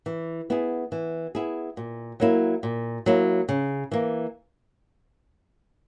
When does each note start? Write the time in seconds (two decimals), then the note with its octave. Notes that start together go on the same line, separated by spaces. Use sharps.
0.06 E3
0.50 B3 E4 G#4
0.92 E3
1.35 B3 E4 G#4
1.77 A#2
2.20 F#3 A#3 E4
2.63 A#2
3.06 F#3 A#3 E4
3.49 C#3
3.92 E3 A#3